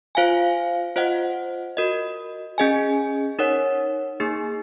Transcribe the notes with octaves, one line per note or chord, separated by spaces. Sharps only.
F4 C5 F5 G#5
F4 C5 D#5 F#5
F#4 A#4 D#5
C#4 G#4 D#5 G#5
D#4 A#4 C#5 F#5
A#3 D#4 G#4